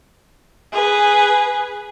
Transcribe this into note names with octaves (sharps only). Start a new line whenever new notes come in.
G#4 B4